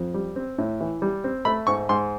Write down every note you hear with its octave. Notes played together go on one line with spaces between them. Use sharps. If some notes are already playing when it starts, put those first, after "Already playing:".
Already playing: F2
G3
C4
A2
E3
G3
C4
A3 B5
G#2 C#6
G#2 C6